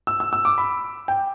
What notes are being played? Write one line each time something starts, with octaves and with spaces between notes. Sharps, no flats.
E6
E6
E6
D6
B5
G5